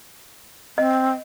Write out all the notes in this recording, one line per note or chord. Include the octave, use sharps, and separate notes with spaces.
C4 D#5